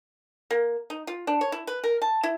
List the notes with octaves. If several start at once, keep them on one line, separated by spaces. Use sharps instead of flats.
A#3
D#4
F4
D4
C#5
E4
B4
A#4
A5
E4